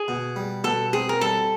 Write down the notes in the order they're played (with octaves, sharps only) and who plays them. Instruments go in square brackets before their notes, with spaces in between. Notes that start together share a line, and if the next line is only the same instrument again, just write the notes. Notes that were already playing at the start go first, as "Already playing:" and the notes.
Already playing: [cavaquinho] G#4
[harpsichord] B2
G3
[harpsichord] B2 [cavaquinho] A4
[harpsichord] C4 [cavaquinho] G#4
[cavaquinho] A#4
[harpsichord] G3 [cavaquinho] A4